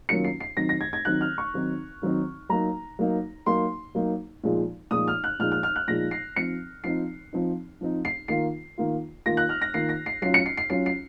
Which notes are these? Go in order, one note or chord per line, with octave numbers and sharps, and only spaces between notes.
D#3 F#3 A#3 C#4 F4 C#7
C7
C7
D#3 F#3 C4 D#4 A#6
A#6
G#6
G#6
D#3 F#3 C4 D#4 F#6
F6
C#6
D#3 F#3 C4 D#4
D#3 F#3 C4 D#4
F#3 A#3 D#4 A#5
F#3 A#3 D#4
F#3 A#3 D#4 C6
F#3 A#3 D#4
A#2 F3 G#3 D#4
A#2 F3 G#3 D#4 D#6
F6
F#6
A#2 F3 G#3 D#4 F6
F6
F6
F#6
A#2 F3 G#3 D#4 A#6
C7
F3 C4 D#4 C#7
F3 C4 D#4 C7
F3 C4 D#4
F3 C4 D#4
C7
D#3 A#3 F4 C7
D#3 A#3 F4
D#3 A#3 F4 A#6
F#6
F6
A#6
D#3 A#3 F4 C7
A#6
C7
F#3 C#4 F4 C7
C#7
C7
C7
F#3 C#4 F4 C7
C7